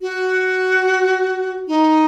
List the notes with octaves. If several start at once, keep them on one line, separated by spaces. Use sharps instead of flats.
F#4
D#4